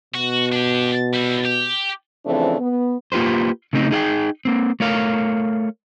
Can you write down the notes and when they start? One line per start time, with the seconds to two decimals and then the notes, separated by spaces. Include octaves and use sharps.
0.14 B2 F#4
0.52 D4 G4
1.13 G3 E4
1.45 G4
2.26 C#3 E3 F3 A3 C4 D4
2.59 B3
3.12 A#3 F4 G4 B4 C5
3.73 C#3 A3 C4 D#4
3.91 D#4 G#4 F5 G5
4.45 A#3 C4
4.80 A3 A#4 C#5 F5